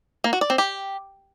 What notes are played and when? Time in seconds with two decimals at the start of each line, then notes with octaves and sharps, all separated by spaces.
0.24 A#3
0.33 F#4
0.41 D5
0.50 C4
0.58 G4